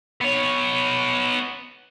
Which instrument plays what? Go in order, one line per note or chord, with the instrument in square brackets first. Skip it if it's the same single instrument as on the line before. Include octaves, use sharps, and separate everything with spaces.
[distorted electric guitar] B3 C#5